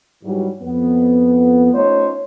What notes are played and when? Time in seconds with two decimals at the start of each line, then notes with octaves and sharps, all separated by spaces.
0.24 G#2 E3 F#3 G3
0.62 F2 B3
1.74 A3 C#4 D#4 F4 C5 C#5